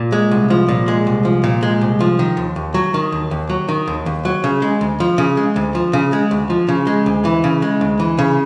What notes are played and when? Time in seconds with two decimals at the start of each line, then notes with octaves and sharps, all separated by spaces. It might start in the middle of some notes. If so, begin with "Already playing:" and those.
Already playing: A#2
0.12 G#3
0.31 C2
0.50 F3
0.68 A#2
0.88 G#3
1.07 C2
1.25 F3
1.44 A#2
1.63 G#3
1.81 C2
2.00 F3
2.19 D#3
2.37 D#2
2.56 D#2
2.74 F#3
2.94 D#3
3.12 D#2
3.31 D#2
3.50 F#3
3.68 D#3
3.88 D#2
4.06 D#2
4.25 F#3
4.44 C#3
4.62 G#3
4.81 D2
5.00 F3
5.18 C#3
5.37 G#3
5.56 D2
5.75 F3
5.93 C#3
6.13 G#3
6.31 D2
6.50 F3
6.68 C#3
6.87 G#3
7.06 D2
7.25 E3
7.44 C#3
7.62 G#3
7.81 D2
8.00 E3
8.19 C#3